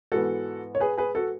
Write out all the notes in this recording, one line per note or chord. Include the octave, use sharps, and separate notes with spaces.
G#2 E3 B3 F#4 A4
C#5
G#4 B4
G#4 B4
F#4 A4